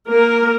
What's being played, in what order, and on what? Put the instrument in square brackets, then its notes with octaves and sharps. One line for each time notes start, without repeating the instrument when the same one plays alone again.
[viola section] A#3 A#4